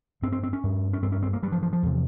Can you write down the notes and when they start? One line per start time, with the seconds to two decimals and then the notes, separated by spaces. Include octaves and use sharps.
0.22 G2 C4
0.32 C4
0.43 C4
0.53 C#4
0.63 G2
0.93 C#4
1.02 G2 C4
1.12 C#4
1.23 C4
1.33 A#3
1.42 G2 G3
1.52 F3
1.63 F3
1.73 F3
1.83 E2 C3